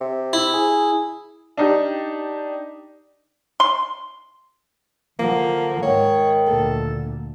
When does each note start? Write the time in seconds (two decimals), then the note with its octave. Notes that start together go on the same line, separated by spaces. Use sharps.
0.01 C3
0.33 E4
0.54 G#4
1.57 D4 D#4 G4
3.60 C6
5.19 D3 F3 A#3
5.83 G#2 D#3 C#5
6.47 D2 A#2 A4